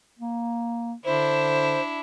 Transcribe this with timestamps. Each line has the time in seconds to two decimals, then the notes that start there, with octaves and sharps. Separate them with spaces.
0.19 A#3
1.05 D3 D4 E4 C5